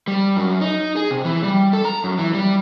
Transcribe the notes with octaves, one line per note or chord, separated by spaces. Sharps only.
G3
F#2
D#4
G#4
C3
E3
G3
A4
A#5
F#2
E3
G3